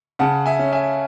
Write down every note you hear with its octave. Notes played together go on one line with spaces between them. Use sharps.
C#3 F#5 A5
E5 G#5
C#4
E5 G#5